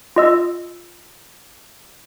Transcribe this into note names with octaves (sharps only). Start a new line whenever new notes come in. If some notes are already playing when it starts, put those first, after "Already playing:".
F4 D#5 E6